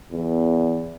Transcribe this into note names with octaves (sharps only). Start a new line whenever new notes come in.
E2